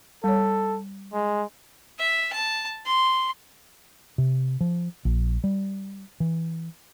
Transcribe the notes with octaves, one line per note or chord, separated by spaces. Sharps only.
G3 A4 C#5
G#3
E5
A5
C6
C3
F3
A#1
G3
E3